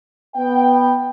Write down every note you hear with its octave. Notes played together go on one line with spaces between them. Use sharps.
B3 G5